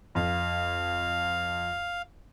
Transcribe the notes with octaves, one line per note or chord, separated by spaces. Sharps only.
F2 F5